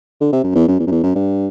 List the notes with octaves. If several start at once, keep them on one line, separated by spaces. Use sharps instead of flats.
D3
C3
F#2
E2
F#2
E2
F#2
E2
F#2
G2